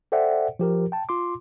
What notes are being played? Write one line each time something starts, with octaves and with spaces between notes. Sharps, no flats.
A4 C5 D5 E5 F#5 G5
F3 G4 A#4
G5 A5
F4 C6 D6